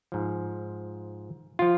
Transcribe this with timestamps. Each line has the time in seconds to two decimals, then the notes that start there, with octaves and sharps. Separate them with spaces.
0.12 G#2 F3
1.59 F3 F4